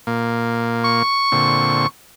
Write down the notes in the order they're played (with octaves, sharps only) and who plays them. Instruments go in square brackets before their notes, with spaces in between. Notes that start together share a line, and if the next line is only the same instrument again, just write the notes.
[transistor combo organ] A#2 A#3
[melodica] C#6
[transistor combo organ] A#2 D3 C4